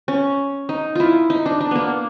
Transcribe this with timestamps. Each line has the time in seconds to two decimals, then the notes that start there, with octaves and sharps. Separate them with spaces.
0.08 C#4
0.69 D#4
0.95 E4 F4
1.30 D#4
1.46 D4
1.61 D4
1.71 A#3 B3